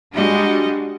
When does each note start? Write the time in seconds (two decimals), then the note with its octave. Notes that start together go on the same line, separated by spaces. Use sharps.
0.15 G3 G#3 D4 F#4 D#5